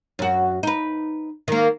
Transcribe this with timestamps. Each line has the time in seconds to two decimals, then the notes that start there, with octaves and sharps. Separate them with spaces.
0.19 F#2 F#4
0.63 D#4 B4
1.48 D#3 A#3